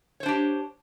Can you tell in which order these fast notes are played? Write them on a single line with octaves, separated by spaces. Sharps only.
C#5 C5 D4 G4